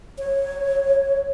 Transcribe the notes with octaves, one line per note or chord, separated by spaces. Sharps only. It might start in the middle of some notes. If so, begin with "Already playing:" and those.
C#5